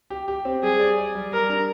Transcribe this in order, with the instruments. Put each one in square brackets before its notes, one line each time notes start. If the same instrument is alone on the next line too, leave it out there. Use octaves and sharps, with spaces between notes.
[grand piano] G4
G4
C4
[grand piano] G3 [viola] G#4
[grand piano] D5
D5
G3
[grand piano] G3 [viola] A#4
[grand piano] D4